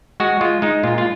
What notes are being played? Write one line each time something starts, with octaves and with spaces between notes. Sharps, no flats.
G#3 F#4
G#3 F4
G#3 D#4
A#2 F4
F4